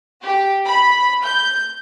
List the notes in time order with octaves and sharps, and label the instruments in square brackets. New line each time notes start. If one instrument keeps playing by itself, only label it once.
[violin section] G4
B5
G6